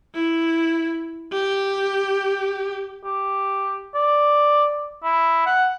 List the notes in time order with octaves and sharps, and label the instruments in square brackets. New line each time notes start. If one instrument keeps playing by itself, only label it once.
[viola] E4
G4
[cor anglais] G4
D5
E4
F#5